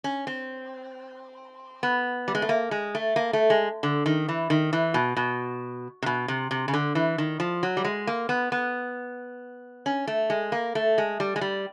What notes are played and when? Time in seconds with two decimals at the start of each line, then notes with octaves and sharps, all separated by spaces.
0.04 C#4
0.27 C4
1.83 B3
2.28 G3
2.35 G#3
2.42 A3
2.49 A#3
2.71 G#3
2.95 A3
3.16 A#3
3.33 A3
3.50 G#3
3.83 D3
4.06 D#3
4.29 E3
4.50 D#3
4.73 E3
4.94 B2
5.17 B2
6.02 C3
6.06 B2
6.28 C3
6.51 C3
6.68 C#3
6.74 D3
6.95 E3
7.18 D#3
7.40 F3
7.63 F#3
7.77 G3
7.84 G#3
8.07 A#3
8.29 B3
8.52 B3
9.86 C#4
10.07 A3
10.30 G#3
10.52 A#3
10.75 A3
10.98 G#3
11.20 G3
11.36 G#3
11.41 G3